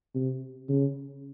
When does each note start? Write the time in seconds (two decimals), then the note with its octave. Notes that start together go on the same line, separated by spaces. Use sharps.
0.15 C3
0.69 C#3